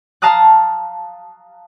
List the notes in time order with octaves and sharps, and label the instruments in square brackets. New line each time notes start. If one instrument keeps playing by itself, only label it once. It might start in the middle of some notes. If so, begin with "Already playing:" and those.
[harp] F5 A5 A#5 D#6 F#6